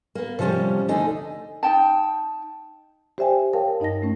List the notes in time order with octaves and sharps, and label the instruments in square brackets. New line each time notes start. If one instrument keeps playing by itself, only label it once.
[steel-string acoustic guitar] A#3 B3
C3 F3 G3 A#3 C#4
D2 D3 A3 D#4 G#5
[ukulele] D#4 G5 A5
[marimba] G4 C5 D5 E5 G5 G#5
A#4 C#5 F5 G5 A5
G2 D#4 D#5 A5 A#6
A3 C#4